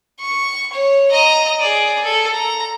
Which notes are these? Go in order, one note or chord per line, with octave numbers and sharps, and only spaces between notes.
C#6
C#5
D#5 A#5
G#4 D5
A4
A#5